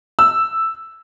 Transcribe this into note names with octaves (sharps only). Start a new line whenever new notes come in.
E6